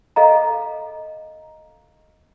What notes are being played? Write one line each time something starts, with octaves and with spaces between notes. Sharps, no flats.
A4 D#5 F5 A#5